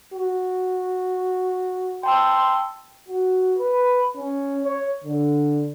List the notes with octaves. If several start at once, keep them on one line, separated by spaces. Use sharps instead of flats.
F#4
G5 A5 C6 E6
F#4
B4
C#4
C#5
D3